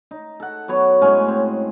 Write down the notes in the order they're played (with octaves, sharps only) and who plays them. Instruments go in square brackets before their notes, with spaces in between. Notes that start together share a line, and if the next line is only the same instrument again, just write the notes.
[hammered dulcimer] D#4
A4 F#5
F#3 B3 C#5
A2 G#3 C#4 G#5
C4